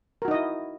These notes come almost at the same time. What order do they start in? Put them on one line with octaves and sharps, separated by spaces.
A#4 F#4 D#4 D#5 E4